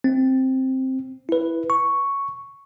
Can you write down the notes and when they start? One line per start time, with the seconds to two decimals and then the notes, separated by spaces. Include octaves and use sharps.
0.04 C4
1.29 E4 B4
1.70 C#6